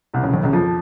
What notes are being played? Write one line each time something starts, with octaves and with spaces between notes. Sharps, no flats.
C2 C3
C#2 C#3
D#2 D#3
C#2 C#3
F2 F3